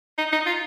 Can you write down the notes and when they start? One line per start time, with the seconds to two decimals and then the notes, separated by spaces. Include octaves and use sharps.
0.18 D#4
0.32 D#4
0.46 F4